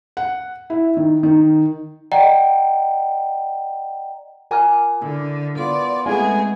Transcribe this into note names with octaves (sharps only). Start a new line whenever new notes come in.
F#5
E4
D#3
D#3
D5 D#5 F#5 G5 A#5
F4 A#4 G#5 A#5 D6 F6
D3 E4
B3 F4 D5
G#3 A3 B3 C4 G#4 F#5 G#5